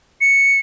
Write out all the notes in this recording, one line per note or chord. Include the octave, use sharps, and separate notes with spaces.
C#7